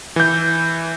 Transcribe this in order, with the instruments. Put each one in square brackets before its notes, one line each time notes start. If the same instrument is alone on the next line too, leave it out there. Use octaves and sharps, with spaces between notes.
[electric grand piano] E3 G6